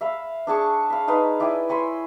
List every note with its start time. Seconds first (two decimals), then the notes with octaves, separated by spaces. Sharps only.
0.01 E5 F5 B5
0.47 D4 G#4 A5 C#6
0.90 F5 B5
1.08 D#4 B4 F5 D#6
1.40 E4 D5 G5 G#5
1.69 C#5 G#5 B5 C6